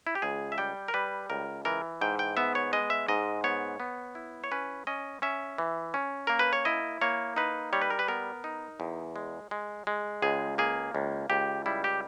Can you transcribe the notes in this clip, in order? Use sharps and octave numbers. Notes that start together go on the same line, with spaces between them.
E4
G4
C#2 G#4
E5
G3 G5
A#4
G3 B4
C#2 A#4
E3 A#4
G#2 G5
G5
B3 E5
C#5
G#3 D#5
E5
G#2 D#5
B3 C#5
B3
E4
C#5
C#4 B4
C#4 D#5
C#4 E5
E3
C#4
A#3 A#4
B4
C#5
E4 D#5
A#3 C#5
D#4 B4
G3 C#5
B4
A#4
B4
B3 A#4
D#4
E2
G#3
G#3
G#3
C#2 G#4
A#3 G#4
C#2
C#2 G4
G3 E4
G4